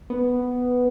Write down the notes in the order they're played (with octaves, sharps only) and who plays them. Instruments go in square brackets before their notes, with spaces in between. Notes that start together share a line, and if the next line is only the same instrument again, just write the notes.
[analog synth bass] B3